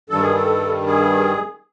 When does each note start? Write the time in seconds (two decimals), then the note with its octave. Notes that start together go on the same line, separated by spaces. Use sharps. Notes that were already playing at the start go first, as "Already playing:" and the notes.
0.10 G2 D#3 G3 A4
0.21 G#4
0.34 A4
0.86 G#4